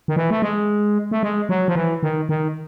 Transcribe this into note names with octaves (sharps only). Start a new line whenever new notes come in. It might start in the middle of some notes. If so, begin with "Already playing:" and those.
D#3
E3
A3
G#3
A3
G#3
F#3
F3
E3
D#3
D#3